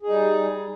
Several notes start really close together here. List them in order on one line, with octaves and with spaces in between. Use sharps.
G#4 D#4 G3